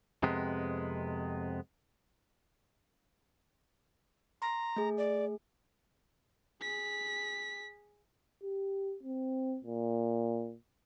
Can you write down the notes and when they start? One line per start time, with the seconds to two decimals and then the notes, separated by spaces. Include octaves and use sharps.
0.23 F2 C3 G#3 B3
4.42 A#5 C6
4.76 A3 G#4
4.98 D5
6.62 G#4 B6
8.43 G4
9.03 C4
9.64 A#2